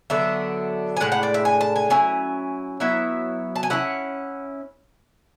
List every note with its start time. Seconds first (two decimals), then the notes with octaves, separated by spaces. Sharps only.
0.10 D3 F#3 B3 D4 E5
0.97 G#5
1.00 A2 G#3 D4 F#5
1.12 F#5
1.23 D5
1.34 E5
1.45 G#5
1.61 A5
1.76 G#5
1.90 F#3 C#4 E4 G#5
2.80 F#3 B3 E4 E5
3.56 A5
3.63 G#5
3.70 F#3 C#4 E4 F#5